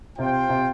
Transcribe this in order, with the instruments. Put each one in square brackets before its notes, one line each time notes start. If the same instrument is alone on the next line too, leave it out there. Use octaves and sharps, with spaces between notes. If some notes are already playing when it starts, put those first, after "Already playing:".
[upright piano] C3 [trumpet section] F4 C5 G5
[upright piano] C3